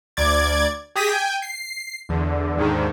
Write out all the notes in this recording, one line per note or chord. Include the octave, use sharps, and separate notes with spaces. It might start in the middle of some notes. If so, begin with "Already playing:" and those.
D2 D5 D6 G#6 A6
G4 G#4 D#6 A#6 B6
G5 G#5
C7
E2 D3
D#2 G#2 D3 D#3